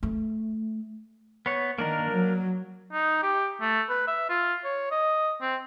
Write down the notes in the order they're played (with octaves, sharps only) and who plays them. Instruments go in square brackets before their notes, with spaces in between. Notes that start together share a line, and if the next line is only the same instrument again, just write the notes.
[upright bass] A3
[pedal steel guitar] B3 C#5
[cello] D#3 [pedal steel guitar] A#3 D4 A#4
[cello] F#3
[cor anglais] D#4
G4
A3
B4
E5
F4
C#5
D#5
C4